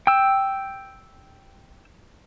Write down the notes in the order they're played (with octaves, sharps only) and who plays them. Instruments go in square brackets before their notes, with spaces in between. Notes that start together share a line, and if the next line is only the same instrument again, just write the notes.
[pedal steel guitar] G5 E6